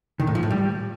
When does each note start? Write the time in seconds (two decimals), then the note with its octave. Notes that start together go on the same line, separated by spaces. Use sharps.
0.20 D#3
0.27 A2
0.35 F3
0.43 A2
0.50 G3